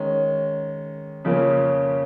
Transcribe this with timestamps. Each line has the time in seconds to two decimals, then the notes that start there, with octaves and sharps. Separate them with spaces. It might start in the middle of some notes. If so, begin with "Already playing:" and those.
Already playing: D#3 G#3 C#4
1.24 F2 C#3 F3 A#3 C#4